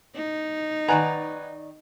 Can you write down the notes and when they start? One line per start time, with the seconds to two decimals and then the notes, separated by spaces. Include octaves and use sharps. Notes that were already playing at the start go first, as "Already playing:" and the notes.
0.15 D#4
0.88 D#3 B4 D5 F#5 G#5 A#5